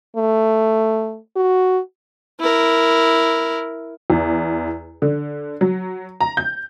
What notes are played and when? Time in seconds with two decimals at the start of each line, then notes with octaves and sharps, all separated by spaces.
0.17 A3
1.36 F#4
2.40 E4 A#4
4.10 E2
5.02 D3
5.61 F#3
6.21 A#5
6.37 G6